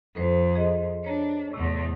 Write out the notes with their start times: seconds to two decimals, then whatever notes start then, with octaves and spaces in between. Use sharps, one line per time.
0.15 F2 A4 B4 C5
0.55 G#4 D#5
1.04 D4 C#5 A#5
1.53 E2 A2 C3 A3